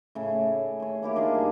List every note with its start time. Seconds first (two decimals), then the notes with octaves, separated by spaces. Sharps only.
0.15 A2 C#3
0.35 D5
0.80 G#4 C#5
1.02 A#3 E4 G4 D6
1.16 D4 D#4 F4 G#4
1.35 G2 G#5